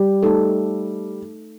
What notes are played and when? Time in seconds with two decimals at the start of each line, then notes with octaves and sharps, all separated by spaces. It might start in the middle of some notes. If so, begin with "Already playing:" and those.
Already playing: G3
0.23 A3 D#4 A4